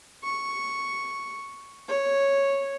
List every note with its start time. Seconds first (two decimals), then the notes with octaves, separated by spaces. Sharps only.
0.23 C#6
1.88 C#5